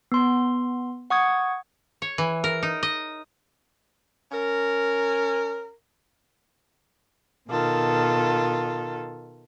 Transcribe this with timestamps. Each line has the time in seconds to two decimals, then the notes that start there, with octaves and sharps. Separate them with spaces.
0.12 B3 C6
1.10 F#5 C#6 D#6 G#6
2.02 C#5
2.18 E3
2.44 A#4
2.63 D#4
2.83 D#5
4.32 C#4 A#4
7.50 B2 D#3 F4 A4